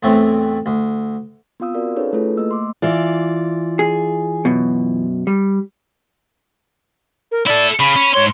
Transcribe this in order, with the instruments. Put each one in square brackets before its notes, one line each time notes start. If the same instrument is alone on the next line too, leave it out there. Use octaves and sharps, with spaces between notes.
[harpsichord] E2 A2 E3 A3 C4
D2
[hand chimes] B3 C4 F4 F5 D#6 E6
C4 F#4 A#4 D5 F5
C#4 D#4 G#4 A4 B4 C#5
A3 E4 F4 G#4 A4 B4
A3 A#3 D#5 E6
C6 D6
[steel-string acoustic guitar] E3 F4 D5
[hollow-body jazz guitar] G#4
F#2 B2
G3
[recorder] A#4
[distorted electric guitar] E4 A4 [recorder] D5
[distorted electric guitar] C#3 [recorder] B5
[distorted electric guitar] C#4
[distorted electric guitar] G#2 C6 [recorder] C#5